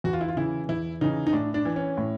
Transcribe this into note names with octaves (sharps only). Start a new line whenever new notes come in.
E2 F#4
F4
E4
F4
C#3 E3 E4
E2 E4
C#3 E3 D#4
D#4
A2 D4
D4
E3
C#4
A2